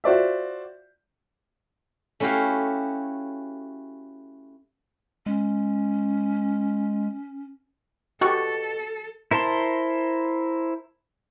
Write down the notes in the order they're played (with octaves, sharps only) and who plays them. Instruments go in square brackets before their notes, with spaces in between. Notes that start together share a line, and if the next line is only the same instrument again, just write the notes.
[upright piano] F4 F#4 C5 D5 E5
[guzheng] A3 C#4 E4 F#4 G4 F5
[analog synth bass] G#3 [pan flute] C#4
[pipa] B2 C#6 [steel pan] F#4 G4 [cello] A4
[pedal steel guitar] E4 A#4 C5 A5 C6